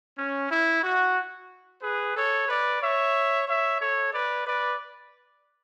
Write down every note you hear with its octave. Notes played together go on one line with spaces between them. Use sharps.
C#4
E4
F#4
G#4 B4
A4 C#5
B4 D5
C#5 E5
C#5 E5
A4 C#5
B4 D5
B4 D5